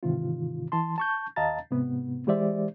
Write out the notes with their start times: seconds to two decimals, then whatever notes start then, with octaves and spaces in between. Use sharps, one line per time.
0.03 G#2 C3 D#3 E3 F4
0.72 E3 A5 C6
0.98 A5 C#6 G6
1.36 D#2 D#5 F5 A5 A#5 A6
1.71 G#2 C3 B3
2.27 E3 G#3 G4 C5 D5 E5